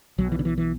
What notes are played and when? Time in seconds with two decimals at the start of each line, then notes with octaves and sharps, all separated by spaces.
0.18 B1 B2 F#3
0.32 E3
0.39 D3
0.45 E3
0.58 E3